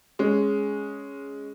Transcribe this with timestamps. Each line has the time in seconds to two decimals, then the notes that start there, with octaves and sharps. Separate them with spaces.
0.19 G#3 C#4